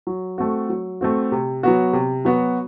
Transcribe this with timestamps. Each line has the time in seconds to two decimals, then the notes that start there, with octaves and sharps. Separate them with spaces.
0.07 F#3
0.38 A3 C4 F#4
0.69 F#3
1.01 A3 C4 F#4
1.32 C3
1.63 F#3 B3 F#4
1.93 C3
2.25 F#3 B3 F#4